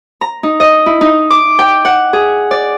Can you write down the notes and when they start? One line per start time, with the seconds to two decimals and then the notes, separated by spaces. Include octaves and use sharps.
0.21 A#5
0.43 D#4
0.60 D#5
0.86 E4
1.01 D#4
1.30 D6
1.59 G5
1.85 F#5
2.13 G#4
2.51 D5